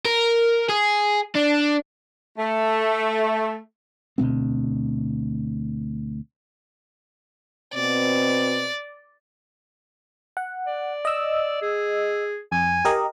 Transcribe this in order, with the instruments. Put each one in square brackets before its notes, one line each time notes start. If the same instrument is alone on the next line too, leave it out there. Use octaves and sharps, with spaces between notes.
[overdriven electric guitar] A#4
G#4
D4
[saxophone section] A3
[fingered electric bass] D2 B2 B3 C4
[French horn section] B2 C4 [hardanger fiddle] D5
[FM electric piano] F#5
[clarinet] D5
[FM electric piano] D#5 E6
[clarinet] G#4
[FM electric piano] F2 [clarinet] G#5
[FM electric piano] G4 A#4 D#5